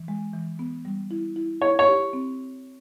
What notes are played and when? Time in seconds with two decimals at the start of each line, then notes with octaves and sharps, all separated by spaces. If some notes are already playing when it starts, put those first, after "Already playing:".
Already playing: E3
0.08 G#3
0.33 E3
0.59 B3
0.85 G3
1.11 E4
1.36 E4
1.61 E4 C#5
1.79 C#5
1.88 G4
2.13 C4